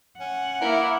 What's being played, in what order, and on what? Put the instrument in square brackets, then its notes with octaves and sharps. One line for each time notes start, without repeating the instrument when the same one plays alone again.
[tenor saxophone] C#4 [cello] F#5
[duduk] A#3 [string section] E4 [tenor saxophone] A#4